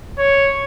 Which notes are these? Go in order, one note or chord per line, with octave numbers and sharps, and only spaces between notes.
C#5